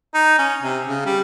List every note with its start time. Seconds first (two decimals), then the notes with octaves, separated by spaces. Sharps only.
0.14 D#4
0.38 C#4
0.62 C3
0.87 C#3
1.06 G3